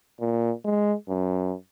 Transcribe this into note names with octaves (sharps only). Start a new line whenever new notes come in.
A#2
G#3
F#2